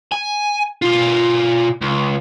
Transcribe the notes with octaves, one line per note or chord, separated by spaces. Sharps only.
G#5
B2 F4
C#2